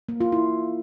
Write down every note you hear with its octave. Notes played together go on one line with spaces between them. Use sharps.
A#3
F4
E4